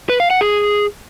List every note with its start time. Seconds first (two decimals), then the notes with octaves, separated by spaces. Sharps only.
0.09 B4
0.20 F5
0.30 F#5
0.41 G#4